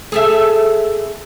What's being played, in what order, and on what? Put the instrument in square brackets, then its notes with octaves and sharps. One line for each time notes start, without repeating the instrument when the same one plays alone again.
[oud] G#4 A4 E5